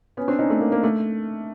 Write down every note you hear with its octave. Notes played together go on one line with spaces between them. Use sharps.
B3 C#4
C4 D4
C#4 D#4
A3
A#3
A#3
A3